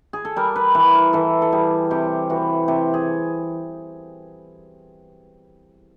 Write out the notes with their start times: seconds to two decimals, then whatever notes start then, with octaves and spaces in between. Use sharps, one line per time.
0.13 G#4
0.25 A4
0.36 G3 A#4
0.56 B4
0.75 E3 B4
0.94 A#4
1.13 E3 A4
1.42 A4
1.52 G3 G#4
1.91 C3 G4
2.30 E3 F#4
2.68 C3 G4
2.94 G#4